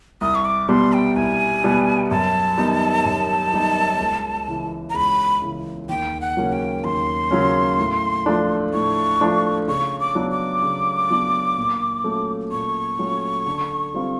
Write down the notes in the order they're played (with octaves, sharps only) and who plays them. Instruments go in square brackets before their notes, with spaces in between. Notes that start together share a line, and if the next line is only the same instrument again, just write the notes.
[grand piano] C2 [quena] D#6
[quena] C#6
D6
[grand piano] B2 G3 B3 [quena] C6
[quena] G5
[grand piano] C2 [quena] G#5
[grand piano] B2 G3 B3
[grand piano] F#2 [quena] A5
[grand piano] D#3 G3 B3 D#4
F#2
D#3 G3 B3 D#4
C#2
C#3 E3
[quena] A#5
[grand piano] C#2 [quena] B5
[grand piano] C#3 E3
[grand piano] D#2 [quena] G5
[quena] F#5
[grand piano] C#3 F#3 A#3 C#4
[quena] G5
[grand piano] D#2 [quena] C6
[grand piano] C#3 F#3 A#3 C#4
A2
F3 A3 D4
[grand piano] A2 [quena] C#6
[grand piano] F3 A3 D4
[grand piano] C#3 [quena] C#6
[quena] D6
[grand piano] F#3 B3 D4
[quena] D6
[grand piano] C#3
F#3 B3 D4
A#2
F#3 A3 C#4 F4
[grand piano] A#2 [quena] C#6
[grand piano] F#3 A3 C#4 F4
D3
G3 C4 F4